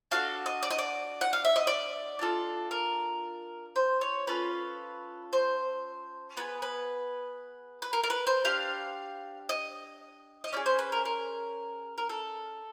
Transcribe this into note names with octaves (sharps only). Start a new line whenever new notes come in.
D4 F#4 A4 F5
D#5
D5
D#5
D5
F#5
F5
E5
D#5
D5
D4 F4 A4
A#4
C5
C#5
C#4 F4 A4 B4
C5
B3 D#4 G#4 B4
B4
B4
A#4
A#4
B4
C5
D4 G4 F5
D#5
D#5
C#4 E4 G#4 D5
C5
B4
A#4
A#4
A#4
A4